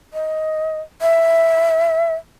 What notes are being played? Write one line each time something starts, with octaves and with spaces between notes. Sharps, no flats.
D#5
E5